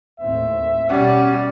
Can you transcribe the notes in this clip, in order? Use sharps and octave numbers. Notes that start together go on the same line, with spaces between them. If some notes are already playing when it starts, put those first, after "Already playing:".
D#2 A2 C4 E5
B2 G3 C#4 F#5